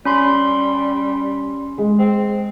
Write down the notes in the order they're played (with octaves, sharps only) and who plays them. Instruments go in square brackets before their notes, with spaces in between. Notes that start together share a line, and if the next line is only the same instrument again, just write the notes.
[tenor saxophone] G3 [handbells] C#4 B5 C6
[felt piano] G#3
[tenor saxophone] C4